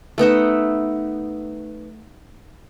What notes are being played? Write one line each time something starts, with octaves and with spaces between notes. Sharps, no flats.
A3 B3 D#4 E5